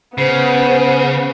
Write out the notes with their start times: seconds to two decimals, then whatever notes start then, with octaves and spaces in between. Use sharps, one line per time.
0.18 C#3 B3 C5